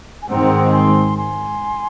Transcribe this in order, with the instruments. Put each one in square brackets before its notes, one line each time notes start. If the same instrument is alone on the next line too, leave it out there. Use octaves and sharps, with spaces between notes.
[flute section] G#5
[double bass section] G#2 D#3 G#3 C4 [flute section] F#5 A#5
[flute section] G#5 C6
G#5 C6